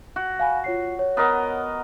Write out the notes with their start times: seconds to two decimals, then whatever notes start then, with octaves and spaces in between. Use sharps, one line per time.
0.16 F#4
0.39 F5 G#5 B5
0.64 F4 C#5 C7
0.99 C#5
1.17 B3 A#4 D#5